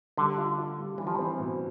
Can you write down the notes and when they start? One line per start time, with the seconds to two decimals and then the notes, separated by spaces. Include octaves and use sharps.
0.18 D3 G3
0.38 F4
0.58 F4
0.78 G3
0.98 E3 G3
1.07 F3
1.15 E3 C4
1.39 B2